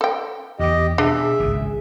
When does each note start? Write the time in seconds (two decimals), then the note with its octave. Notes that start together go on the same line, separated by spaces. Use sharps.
0.01 A4 G5
0.59 E2 D#3 G4 D#5
0.98 B2 D4 G#4 E5
1.40 G#1 C#2 G2